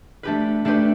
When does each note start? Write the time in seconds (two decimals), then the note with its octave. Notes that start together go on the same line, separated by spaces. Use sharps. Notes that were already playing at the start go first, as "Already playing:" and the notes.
0.23 A3 D4 G4 B4
0.65 A3 D4 G4 B4